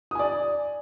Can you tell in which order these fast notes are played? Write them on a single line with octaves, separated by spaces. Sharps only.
D#6 G#5 D5